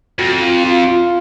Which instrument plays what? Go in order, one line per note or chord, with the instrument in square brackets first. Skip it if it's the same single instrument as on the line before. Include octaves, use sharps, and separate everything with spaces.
[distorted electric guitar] F2 [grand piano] F#4
[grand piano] F4
F4
F4